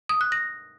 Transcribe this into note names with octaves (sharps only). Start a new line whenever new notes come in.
D#6
F#6
A#6